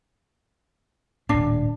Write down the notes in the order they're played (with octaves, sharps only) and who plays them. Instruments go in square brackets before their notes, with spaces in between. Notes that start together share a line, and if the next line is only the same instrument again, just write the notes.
[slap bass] D#1 A2 [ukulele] D4